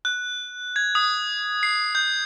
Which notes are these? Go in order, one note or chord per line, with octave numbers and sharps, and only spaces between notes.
F#6
G#6
D#6
C7
G6